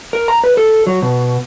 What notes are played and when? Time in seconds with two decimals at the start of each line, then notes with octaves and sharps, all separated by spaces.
0.13 A#4
0.28 A#5
0.44 B4
0.57 A4
0.87 F#3
1.02 B2